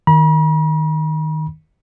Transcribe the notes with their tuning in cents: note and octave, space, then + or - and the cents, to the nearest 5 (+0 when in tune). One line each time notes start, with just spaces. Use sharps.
D#3 +0 B5 -45